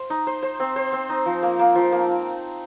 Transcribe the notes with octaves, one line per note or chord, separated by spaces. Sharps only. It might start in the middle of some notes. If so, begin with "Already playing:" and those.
Already playing: C5
D#4
C5
C5
C4
C5
C4
D#4
F3
A#3
A#3
F3
A#3